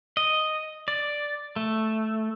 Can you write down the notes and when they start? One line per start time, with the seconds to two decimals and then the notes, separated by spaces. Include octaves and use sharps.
0.17 D#5
0.88 D5
1.56 A3